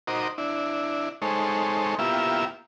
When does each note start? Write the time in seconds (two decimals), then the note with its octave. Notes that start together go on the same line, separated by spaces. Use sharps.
0.07 D#4 F#4 A#4 C5 D#5 D6
0.38 D4 E4
1.22 G#3 D#4 A4 C5 C#5
1.99 A#3 B3 E4 F4 G4 E5